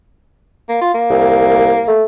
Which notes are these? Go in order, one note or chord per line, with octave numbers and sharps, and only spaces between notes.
A#3
F4
A#3
C2
A3